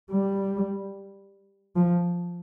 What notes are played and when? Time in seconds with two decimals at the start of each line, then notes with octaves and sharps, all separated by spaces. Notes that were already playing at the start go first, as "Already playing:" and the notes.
0.11 G3
1.76 F3